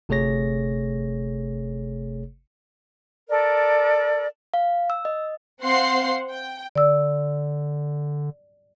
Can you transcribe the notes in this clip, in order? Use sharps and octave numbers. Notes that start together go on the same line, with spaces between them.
G1 C3 A3 G#4 C#5 A#6
A4 A#4 D5
F5
E6
D#5
C4 C5 F5 F#5 C6 C7
G5
D3 D5 E6